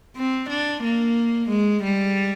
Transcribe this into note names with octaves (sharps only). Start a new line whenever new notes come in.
C4
D4
A#3
G#3
G3